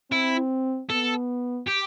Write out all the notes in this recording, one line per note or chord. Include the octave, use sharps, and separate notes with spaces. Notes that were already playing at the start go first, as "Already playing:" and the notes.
C4 E4
B3 A4
G4